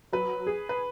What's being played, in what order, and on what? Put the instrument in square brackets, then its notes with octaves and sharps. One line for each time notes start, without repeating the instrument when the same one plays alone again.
[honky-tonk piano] F#3 [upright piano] B4
[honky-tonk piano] G#4
[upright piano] B4